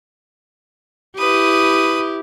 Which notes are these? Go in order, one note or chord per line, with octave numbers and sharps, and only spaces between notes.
E4 G4 B4 D#6